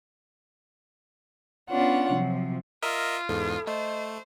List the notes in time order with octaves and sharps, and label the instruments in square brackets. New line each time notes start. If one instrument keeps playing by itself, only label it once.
[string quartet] B3 C#4 D4 F4 C#5 F#5
C3 F3 F#3
[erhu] F4 [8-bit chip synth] A#4 D#5 E5
[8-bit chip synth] E2 G#2 [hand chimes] A4
[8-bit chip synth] A3 [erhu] C5 [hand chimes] D#5